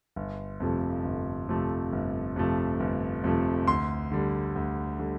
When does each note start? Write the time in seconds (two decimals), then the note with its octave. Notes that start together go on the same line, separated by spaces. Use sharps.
0.16 G1
0.60 F2 C3 F3 A3
1.04 G1
1.48 F2 C3 F3 A3
1.92 G1
2.36 F2 C3 F3 A3
2.80 G1
3.24 F2 C3 F3 A3
3.68 D2 C6
4.12 D3 G3
4.55 D2
4.99 D3 G3